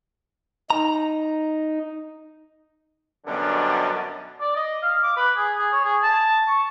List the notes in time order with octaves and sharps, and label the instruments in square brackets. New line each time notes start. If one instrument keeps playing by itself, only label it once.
[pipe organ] D#4 [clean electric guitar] A#5
[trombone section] F#2 B2 D3 G3 D4
[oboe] D5
D#5
F5
D6
B4
G#4
G#4
C#5
G#4
A5
C#6